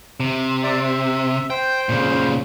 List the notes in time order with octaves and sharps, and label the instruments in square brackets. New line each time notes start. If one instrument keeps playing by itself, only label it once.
[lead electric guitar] C3
[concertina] D5 E5
E5
[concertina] C5 [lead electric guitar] G5
[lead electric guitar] A#2 C#3